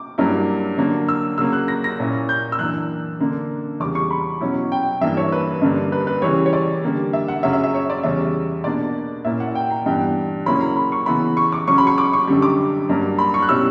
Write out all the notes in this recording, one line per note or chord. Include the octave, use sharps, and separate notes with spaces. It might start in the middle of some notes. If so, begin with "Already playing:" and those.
Already playing: D6
G2 F#3 A#3 E4
D3 F#3 A#3 D4
E6
C#3 F#3 A#3 E6
F#6
A#6
A#6
A#2 A#3 C#4 E4
G6
E6
F#2 E3 A#3 D4 F#6
D3 A#3 D4
E2 C#3 G3 D6
C#6
B5
B2 F#3 C#4 E4
G5
G2 E3 A#3 D4 E5
C#5
B4
G2 D3 A#3 D4
B4
B4
C#3 E3 G3 C#5
C#5
D5
D3 G3 A#3
E5
F#5
F#2 C#3 F#3 C#4 E5
E5
E5
C#5
D5
E2 C#3 G3 C#4 E5
B2 A#3 D4 D5
A#2 A#3 C#4 E4 E5
F#5
G5
A#5
G2 E3 B3 G5
C#3 F#3 A#3 C#4 E4 B5
A#5
B5
C#6
C#3 E3 B3 E4 B5
C#6
D6
C#3 F#3 C#4 C#6
B5
C#6
D6
C#6
F#2 D3 G3
D6
G2 F#3 A#3
B5
C#6
F#6
B2 G3 C#4 E4 E6